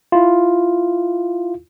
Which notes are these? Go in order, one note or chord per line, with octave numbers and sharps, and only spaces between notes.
E4 F4